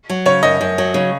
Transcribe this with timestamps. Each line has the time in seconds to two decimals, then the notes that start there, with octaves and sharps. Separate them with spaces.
0.10 F#3
0.26 C#3 C#5
0.43 F#2 D#5
0.61 F#2
0.78 F#3
0.94 C#3